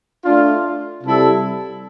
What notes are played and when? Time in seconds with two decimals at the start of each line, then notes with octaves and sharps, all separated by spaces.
0.24 A3 D4 F4
1.03 C3 G3 C4 E4 A4